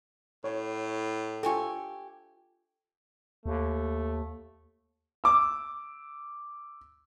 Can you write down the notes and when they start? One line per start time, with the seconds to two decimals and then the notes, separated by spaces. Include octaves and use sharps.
0.44 A2 C#5
1.43 F4 G4 A4 G#5 C#6
3.46 D#2 A3
5.24 D6 E6